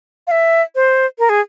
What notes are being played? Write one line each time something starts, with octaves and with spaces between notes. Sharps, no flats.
F5
E5
C5
A#4
G#4